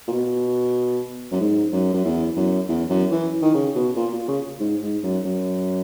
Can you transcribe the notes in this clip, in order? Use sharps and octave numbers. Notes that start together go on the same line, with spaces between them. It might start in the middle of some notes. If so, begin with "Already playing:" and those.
A#2
B2
F#2
G#2
F#2
F#2
E2
F#2
E2
F#2
E3
D#3
C#3
B2
A#2
A#2
C#3
G#2
G#2
F#2
F#2